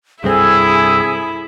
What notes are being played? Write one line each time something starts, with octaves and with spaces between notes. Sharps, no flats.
C2 G2 C4 E4 G#4 A4